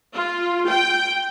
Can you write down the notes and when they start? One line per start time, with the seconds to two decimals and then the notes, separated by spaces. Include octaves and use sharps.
0.15 F4
0.70 G5